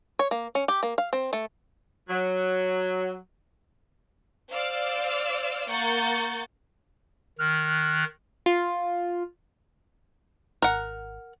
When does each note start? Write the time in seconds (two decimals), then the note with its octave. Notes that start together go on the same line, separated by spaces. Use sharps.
0.19 C#5
0.31 A#3
0.55 C#4
0.68 G4
0.83 A#3
0.98 F5
1.13 C4
1.33 A3
2.09 F#3
4.50 C5 D5 F5 D6 E6 F6
5.69 A#3 F#5 C#6 G6 A6 C#7
7.39 D#3 F6 F#6
8.46 F4
10.62 G#1 A#4 F#5